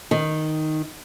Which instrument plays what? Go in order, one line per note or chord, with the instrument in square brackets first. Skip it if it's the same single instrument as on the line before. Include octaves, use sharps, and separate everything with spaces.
[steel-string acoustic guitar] D#3